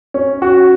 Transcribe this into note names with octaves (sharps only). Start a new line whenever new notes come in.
C#4
F#4